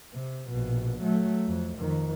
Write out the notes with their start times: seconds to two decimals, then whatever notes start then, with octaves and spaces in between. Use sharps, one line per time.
0.14 C3
0.49 A#1 B2
1.02 F#3 A3
1.48 F2
1.78 F2 D#3